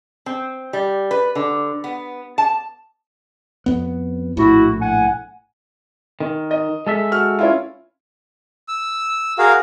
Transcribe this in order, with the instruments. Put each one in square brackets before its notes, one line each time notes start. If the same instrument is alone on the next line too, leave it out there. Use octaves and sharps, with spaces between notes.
[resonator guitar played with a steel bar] C4
G3
B4
D3
B3
A5
[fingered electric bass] F2 B3
[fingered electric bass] A#1 A2 [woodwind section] E4 F#4
[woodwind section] F#5 G#5
[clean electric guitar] D#3
[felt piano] D#5
[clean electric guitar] G#3 A4 E5
[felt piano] F#4 F6
C#4 E4 F4
[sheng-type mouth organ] E6
F#4 G#4 A#4 F5